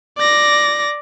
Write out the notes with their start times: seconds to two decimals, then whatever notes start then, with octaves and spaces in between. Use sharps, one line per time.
0.18 D5 A#6